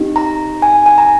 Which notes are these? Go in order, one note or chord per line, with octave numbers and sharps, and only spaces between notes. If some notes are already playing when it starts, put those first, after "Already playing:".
Already playing: C4 D#4 G4
A#5
G#5
G#5
A#5